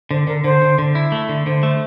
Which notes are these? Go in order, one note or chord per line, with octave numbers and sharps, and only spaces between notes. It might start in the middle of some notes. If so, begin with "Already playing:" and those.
D3 C5
D3 A#4
D3 C5
D3
D3
E4
A3
D3
D3 C5
A3